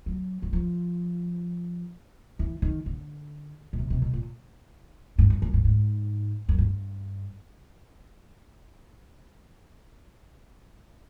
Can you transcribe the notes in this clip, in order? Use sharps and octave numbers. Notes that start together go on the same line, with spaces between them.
F#3
F#3
F3
E3
D#3
D3
B2
C3
C3
B2
A#2
G2
F#2
F#2
G2
G#2
F#2
G2